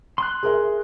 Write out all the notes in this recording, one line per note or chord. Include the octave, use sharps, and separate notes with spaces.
C6 F#6
G#4 A#4 E5